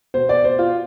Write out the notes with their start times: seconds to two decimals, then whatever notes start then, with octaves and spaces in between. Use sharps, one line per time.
0.14 B2 C5
0.29 D5
0.44 C5
0.59 F4